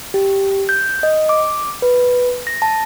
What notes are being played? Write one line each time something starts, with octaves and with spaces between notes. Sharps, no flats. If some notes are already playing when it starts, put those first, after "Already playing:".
G4
G6
D#5
D6
B4
A#6
A5